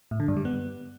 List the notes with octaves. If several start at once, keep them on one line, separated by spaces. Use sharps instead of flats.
A2
D3
G2
G3
B3